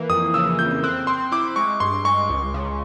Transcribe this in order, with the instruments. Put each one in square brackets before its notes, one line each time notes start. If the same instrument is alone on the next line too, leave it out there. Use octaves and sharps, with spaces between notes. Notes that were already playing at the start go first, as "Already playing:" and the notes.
Already playing: [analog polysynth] E3 A#3
[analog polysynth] F2 [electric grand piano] D#6
[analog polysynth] C#3 [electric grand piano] E6
[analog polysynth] F2 [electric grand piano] G6
[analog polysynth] C4 [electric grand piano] F#6
[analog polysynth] C4 [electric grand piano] C6
[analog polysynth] E4 [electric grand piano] D6
[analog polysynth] G#3 [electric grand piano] C#6
[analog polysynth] G2 [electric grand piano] C6
[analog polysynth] G#3 [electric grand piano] C#6
[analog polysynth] C#2
C#3